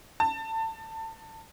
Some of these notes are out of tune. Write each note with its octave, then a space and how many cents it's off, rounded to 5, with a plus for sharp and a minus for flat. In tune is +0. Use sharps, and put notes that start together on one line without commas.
A5 +25